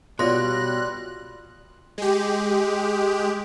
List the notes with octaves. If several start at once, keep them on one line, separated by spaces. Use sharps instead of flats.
B2 G3 F4 C#5 D5 C6 F#6 A#6
G#3 G4